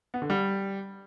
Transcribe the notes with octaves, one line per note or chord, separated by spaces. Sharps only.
B3
D3
G3